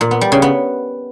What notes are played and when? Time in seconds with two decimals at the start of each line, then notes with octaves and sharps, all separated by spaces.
0.01 A#2
0.11 B3
0.21 G3
0.32 C#3
0.42 B3